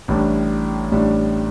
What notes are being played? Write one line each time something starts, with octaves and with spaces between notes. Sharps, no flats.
A1 A2 G3 D4
A1 A2 G3 D4